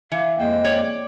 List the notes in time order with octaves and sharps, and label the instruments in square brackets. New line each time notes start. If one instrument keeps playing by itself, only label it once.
[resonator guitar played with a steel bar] E3 [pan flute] F5
[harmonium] F2 G#3 G5 [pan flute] A#3
[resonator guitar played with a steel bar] C#5 D5